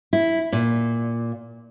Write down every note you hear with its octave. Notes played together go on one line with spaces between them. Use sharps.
E4
A#2